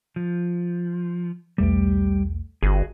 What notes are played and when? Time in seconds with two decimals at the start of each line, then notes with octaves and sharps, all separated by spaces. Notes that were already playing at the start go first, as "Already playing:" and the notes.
0.16 F3
1.58 B1 E2 G3 A3 G4
2.63 G1 F#4 G#4